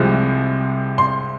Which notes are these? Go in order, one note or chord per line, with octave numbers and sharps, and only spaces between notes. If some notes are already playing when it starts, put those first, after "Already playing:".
Already playing: C2 C3 F3 G#3 C4
C6